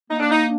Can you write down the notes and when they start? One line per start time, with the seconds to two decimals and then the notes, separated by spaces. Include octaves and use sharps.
0.10 A#3 D#4
0.20 D4
0.31 D#4
0.43 D4